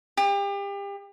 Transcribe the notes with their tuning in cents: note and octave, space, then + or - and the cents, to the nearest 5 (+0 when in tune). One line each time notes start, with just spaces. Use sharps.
G4 +35